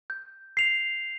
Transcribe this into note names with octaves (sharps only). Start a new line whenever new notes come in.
G6
C7 F7